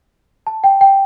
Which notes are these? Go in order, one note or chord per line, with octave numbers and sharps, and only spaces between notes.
A5
G5
G5